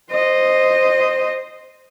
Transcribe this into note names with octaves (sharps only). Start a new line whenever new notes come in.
C5 D#5